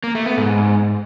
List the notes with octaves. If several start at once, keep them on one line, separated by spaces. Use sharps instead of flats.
A#3
A3
B3
G#2